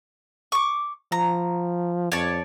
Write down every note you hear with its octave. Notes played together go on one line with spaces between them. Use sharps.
C#6 D6
F3 A#5
F2 C#5 D5 A5